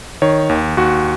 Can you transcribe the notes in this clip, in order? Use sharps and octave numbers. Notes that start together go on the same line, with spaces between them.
D#3 C#5
D#2
D#2 F#4